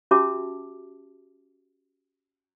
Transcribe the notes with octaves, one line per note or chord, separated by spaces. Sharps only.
C#4 F#4 G4 E5 A5 D6